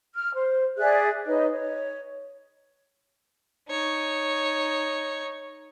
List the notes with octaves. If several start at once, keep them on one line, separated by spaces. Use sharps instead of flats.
F6
C5
G#4 D5 E5 F#6
D#4 B4 C#5 D#5
C#5
D#4 C#5